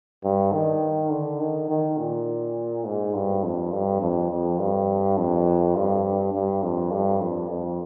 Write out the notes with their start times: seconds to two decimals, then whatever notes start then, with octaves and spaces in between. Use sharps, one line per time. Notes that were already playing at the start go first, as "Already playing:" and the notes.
0.24 G2
0.53 D#3
1.11 D3
1.40 D#3
1.70 D#3
1.98 A#2
2.85 G#2
3.14 G2
3.43 F2
3.73 G2
4.01 F2
4.31 F2
4.59 G2
5.17 F2
5.76 G2
6.33 G2
6.63 F2
6.91 G2
7.21 F2
7.50 F2